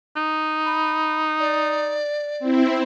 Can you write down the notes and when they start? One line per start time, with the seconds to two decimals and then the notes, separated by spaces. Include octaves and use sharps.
0.16 D#4
0.65 B5
1.40 D5
2.39 C4 E4